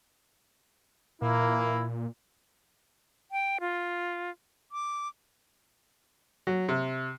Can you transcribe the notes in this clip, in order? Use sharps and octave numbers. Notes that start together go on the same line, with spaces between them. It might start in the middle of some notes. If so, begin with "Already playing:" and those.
A#2 E3 A#3 E4
G5
F4
D6
F#3
C3